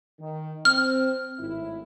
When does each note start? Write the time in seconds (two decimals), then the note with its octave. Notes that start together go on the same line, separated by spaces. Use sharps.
0.20 D#3
0.65 C4 F6
1.39 G#1 A2 E4